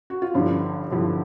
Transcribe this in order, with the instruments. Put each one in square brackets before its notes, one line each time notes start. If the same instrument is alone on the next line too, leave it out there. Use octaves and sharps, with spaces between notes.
[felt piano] F#4
F4
G1 G2 D3 F3 E4
G1 G2 D3 F3 E4